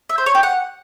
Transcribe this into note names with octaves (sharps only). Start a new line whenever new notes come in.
E5
C5
C#5
G4
F#5